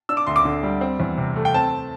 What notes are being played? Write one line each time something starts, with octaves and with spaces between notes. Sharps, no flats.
D4 E6
D6
D2 C6
D6
D3
G3
C4
E2
C3
A3
G5
C4 A5